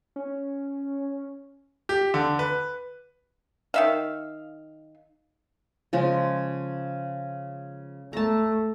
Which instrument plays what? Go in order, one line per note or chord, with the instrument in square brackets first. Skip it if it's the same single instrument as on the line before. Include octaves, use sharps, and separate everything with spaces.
[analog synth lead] C#4
[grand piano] G4
D3
B4
[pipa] D#3 E5 F5
[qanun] C#3 F3 G#3
[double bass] A3 [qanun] A5 A#5